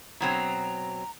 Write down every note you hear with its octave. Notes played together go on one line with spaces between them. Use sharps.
B2 F#3 C4 A#5